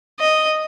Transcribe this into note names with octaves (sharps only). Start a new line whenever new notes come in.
D#5